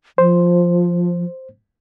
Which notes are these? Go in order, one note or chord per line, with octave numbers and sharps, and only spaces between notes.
F3 C5